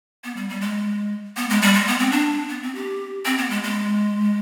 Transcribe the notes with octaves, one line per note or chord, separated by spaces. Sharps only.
B3
G3
G3
G#3
B3
G#3
G3
G#3
B3
C4
D4
B3
C4
G4
C4
B3
G#3
G#3